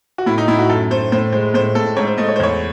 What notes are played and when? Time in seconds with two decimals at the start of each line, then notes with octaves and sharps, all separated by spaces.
0.18 F#4
0.26 A2 E4
0.38 D#4
0.48 A2 E4
0.59 F#4
0.69 F#2 A4
0.91 A3 C5
1.12 A2 C5
1.32 G#3 C5
1.54 A2 C5
1.75 A2 A4
1.97 G#2 C#5
2.07 C5
2.18 A3 D#5
2.28 C#5
2.36 C5
2.40 E2 C#5